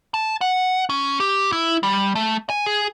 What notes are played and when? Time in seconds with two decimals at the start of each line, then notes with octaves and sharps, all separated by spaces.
0.14 A5
0.41 F#5
0.89 C#4
1.20 G4
1.52 E4
1.83 G3
2.15 A3
2.50 G#5
2.66 G#4